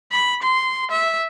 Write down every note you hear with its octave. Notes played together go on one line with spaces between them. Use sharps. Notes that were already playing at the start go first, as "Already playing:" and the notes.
B5
C6
E5